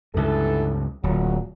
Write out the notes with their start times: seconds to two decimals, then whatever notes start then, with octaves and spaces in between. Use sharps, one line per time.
0.14 C#2 G2 D3 E3 A4
1.03 D1 A#2 F#3